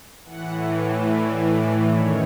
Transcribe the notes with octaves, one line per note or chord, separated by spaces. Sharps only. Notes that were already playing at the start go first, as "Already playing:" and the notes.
A2 E3 F#5
D5
D5
F#2 D#3 C#5